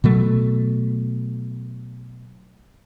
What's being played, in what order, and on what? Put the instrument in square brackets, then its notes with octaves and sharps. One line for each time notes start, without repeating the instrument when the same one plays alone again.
[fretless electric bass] B2 F#3 A3